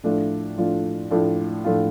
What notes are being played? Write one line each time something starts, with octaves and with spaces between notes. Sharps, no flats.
A2 F3 A3 D4 F4
A2 F3 A3 D4 F4
A2 F3 A3 D4 F4
A2 F3 A3 D4 F4